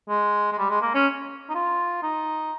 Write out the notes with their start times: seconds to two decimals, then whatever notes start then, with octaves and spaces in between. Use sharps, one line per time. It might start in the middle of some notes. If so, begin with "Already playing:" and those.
0.09 G#3
0.52 G#3
0.58 G3
0.70 G#3
0.82 A#3
0.95 C#4
1.49 D#4
1.55 F4
2.03 D#4